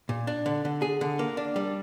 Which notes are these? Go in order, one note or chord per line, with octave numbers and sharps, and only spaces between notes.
A#2
D4
D3
D3
G#4
D3
A#3
D4
G3